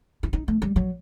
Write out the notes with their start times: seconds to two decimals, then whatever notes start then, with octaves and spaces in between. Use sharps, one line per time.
0.23 E4
0.33 D#4
0.48 A3
0.62 G3
0.76 F#3